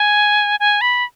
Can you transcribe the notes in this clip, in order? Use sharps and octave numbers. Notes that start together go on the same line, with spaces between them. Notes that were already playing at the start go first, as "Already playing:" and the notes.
Already playing: G#5
G#5
B5